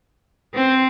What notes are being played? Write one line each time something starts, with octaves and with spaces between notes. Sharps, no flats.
C4